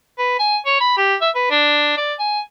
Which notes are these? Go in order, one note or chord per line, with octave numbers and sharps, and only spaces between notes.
B4
G#5
C#5
B5
G4
E5
B4
D4
D5
G#5